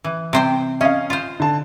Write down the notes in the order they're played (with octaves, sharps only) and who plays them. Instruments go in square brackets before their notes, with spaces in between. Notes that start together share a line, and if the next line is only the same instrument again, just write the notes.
[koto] E3
C3 C5 G5
[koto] C#4 [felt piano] D#5 F5
[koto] F4 C5
[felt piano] D3 A5